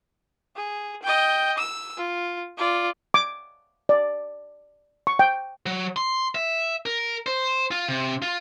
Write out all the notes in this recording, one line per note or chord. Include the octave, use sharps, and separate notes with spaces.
G#4
D#5 G5
E6
F4
F4 D5
D6
D5
C#6
G5
F#3
C6
E5
A#4
C5
F4
C3
F4